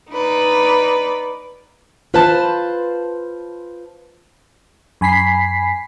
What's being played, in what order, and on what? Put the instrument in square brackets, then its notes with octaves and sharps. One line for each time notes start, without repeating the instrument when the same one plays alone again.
[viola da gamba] D#4 B4 D5
[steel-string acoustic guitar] F4 B4 C5 A5
[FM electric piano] F#2 G#5 B5 B6 C7